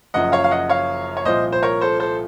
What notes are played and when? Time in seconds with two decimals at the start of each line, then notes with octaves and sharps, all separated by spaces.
0.14 F#1 F#2 F3 D#5 F#5
0.32 C#5 F5
0.44 F5
0.51 D#5 F#5
0.69 C#5 F5
1.17 C#5
1.25 C2 A#2 F3 C5 D#5
1.52 C5
1.63 A#4 C#5
1.81 A4 C5
2.00 A4 C5